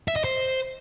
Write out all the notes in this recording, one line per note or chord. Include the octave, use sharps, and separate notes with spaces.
E5
D#5
C5